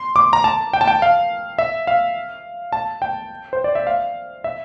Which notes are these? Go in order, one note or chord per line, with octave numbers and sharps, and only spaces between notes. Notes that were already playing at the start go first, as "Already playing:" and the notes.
Already playing: C6
D6
A#5
A5
G5
A5
G5
F5
E5
F5
A5
G5
C5
D5
E5
F5
E5